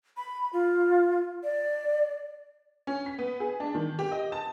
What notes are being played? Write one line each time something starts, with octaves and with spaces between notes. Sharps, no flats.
B5
F4
D5
C#4
B6
B3
G#4
D4
D#3
G4
D#5
A5